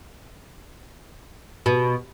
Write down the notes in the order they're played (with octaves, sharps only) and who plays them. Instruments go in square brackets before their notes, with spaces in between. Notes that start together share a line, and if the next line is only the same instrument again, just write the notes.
[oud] B2